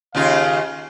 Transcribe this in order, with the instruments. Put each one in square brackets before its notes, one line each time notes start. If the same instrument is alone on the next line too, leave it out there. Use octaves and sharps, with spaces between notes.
[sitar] D#2 C#3 F4 [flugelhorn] F5